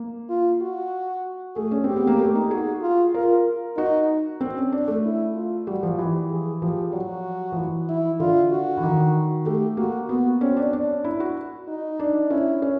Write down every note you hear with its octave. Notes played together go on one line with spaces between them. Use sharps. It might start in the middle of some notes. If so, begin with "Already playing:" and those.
Already playing: A#3
F4
F#4
A3 G#4
C#4
C4 G4
B3
A#3
A3
D#4
F#4 G#4
F4
F4 A#4
D#4 F#4
C4
C#4
D4
A3
E4
F4
G3 F#4
F3
E3 G4
G#4
F3 G4
F#3 F#4
F3
E3
E4
D3 F4
F#4
E3
D#3
A3 G4
A#3 F#4
B3 F#4
C4 C#4
D4
D4
E4
F#4
D#4
D4
C#4 E4
C#4